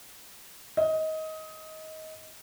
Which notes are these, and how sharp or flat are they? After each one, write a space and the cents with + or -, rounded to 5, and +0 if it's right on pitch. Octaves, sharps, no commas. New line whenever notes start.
D#5 +20